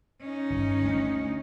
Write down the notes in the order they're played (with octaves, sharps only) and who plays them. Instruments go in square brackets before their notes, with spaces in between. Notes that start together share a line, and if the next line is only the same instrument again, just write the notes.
[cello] C#4 D#4
[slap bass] G1
D2 A3 D4